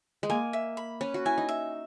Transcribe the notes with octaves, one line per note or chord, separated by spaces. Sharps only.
G#3
A#3 G#5
E5
B5
C#4 B4
F#4
E4 G#5
D#4
E5